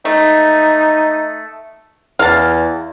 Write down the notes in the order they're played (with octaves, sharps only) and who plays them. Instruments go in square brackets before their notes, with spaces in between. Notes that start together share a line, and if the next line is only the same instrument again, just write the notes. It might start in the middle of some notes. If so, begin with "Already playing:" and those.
[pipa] A3 [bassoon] D#4
[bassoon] E2 [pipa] F5 A5